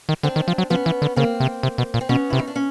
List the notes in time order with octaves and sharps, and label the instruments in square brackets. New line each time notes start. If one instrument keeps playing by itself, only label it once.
[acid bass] D#3
[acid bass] D3 [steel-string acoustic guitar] C4 D4
[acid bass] D#3
F3
F#3
[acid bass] F3 [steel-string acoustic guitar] B3 C#4
[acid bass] E3
D3
[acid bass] C#3 [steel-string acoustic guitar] A#3 C4
[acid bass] C3
C3
B2
A#2
[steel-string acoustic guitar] C4
[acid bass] B2 [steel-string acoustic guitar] B3 C#4
[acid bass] C3 [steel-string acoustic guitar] E4
[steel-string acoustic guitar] D#4
D4
C#4